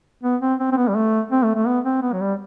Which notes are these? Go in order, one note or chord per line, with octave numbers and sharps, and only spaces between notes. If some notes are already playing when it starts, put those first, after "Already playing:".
B3
C4
C4
C4
B3
G3
A3
C4
A3
A3
B3
C4
B3
F#3
G3